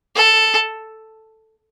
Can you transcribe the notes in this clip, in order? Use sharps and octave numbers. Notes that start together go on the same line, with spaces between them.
A4